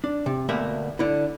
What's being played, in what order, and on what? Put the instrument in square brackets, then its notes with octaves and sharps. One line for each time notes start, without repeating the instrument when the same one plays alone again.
[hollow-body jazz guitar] D4
C3
D2 B2 A3 A#3 E5 B5
D3 E4